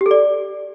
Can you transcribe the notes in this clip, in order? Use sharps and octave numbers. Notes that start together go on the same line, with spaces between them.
G4
A4
D5